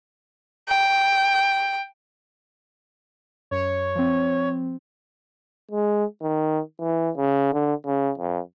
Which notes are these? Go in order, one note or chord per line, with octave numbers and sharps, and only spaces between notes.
G5
F#2 C#5
F3 C4
G#3
D#3
E3
C#3
D3
C#3
F2